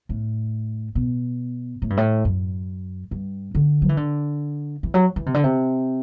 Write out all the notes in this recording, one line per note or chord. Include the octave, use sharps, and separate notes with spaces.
A2
B2
A2
G2
A2
F#2
G2
D3
F#3
E3
D3
E3
F#3
E3
C3
D3
C3